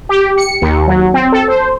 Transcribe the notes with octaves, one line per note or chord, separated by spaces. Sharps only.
G4
C#7
D#2
F#3
C4
A4
C5